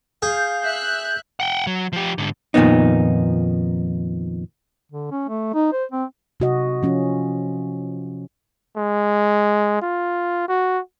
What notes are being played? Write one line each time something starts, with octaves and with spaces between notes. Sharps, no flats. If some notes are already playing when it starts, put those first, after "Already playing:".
G#4 F5 G6
E5 F#6
F#5 G5
F#3
F3 G4
G#2 D3
F2 A#2 D#3 B3 D#4
D3
C#4
A3
D#4
C5
C4
C3 F#4 D#5
F3 C#4 F4
G#3
F4
F#4